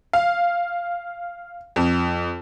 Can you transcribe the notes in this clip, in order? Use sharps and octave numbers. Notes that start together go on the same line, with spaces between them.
F5
F2